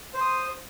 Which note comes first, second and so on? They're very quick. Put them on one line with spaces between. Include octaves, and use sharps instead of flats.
C5 C6 D#6